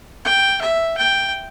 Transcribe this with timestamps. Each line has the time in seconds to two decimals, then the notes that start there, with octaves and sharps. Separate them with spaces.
0.25 G5
0.61 E5
0.98 G5